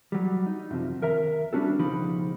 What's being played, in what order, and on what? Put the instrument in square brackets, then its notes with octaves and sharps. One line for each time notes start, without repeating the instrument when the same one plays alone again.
[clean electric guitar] F#3 G3
D#4
F#2 C3 F3
D#2 A#4 E5 A#5
G3 C#4 D4 F#4 A4
C#2 B2 F3 D#4 G4 B5